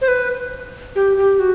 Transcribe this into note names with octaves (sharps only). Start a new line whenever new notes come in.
C5
B4
G4
G4
F#4